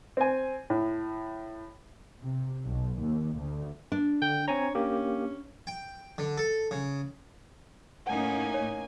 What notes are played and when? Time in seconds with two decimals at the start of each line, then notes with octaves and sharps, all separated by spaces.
0.17 C4 G#5
0.70 A2
2.21 C3
2.66 B1
3.01 D#2
3.38 D2
3.92 D4
4.22 D3 G5
4.48 C4 C#5 G#5 A#5
4.75 A#3 C#4 G4
5.67 G5
6.18 D3
6.38 A4
6.71 C#3
8.07 A2 A#3 C#4 D#4 F#5 G#5
8.54 C#5